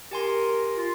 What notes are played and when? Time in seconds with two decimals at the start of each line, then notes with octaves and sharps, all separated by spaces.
0.11 G4 A#4 G#5 C6
0.77 F4